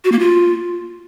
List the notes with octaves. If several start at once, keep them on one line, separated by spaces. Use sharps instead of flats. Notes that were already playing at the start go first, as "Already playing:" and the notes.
F#4
A#3
F4